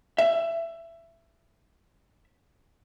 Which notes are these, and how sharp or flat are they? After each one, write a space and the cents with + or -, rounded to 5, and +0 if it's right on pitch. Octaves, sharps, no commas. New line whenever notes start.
E5 +15